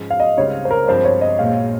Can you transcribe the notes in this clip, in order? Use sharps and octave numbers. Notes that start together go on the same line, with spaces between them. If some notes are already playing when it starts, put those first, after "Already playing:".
Already playing: G#2 F3 G#3 C#4
F5
D#5
C#2 C#3 G3 C4 D#4 C#5
C5
A#4
G2 F3 G#3 C4 C5
C#5
D#5
A#1 A#2 G#3 F5